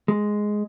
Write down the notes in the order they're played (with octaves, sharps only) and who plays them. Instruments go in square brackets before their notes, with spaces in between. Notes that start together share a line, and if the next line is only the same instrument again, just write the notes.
[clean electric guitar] G#3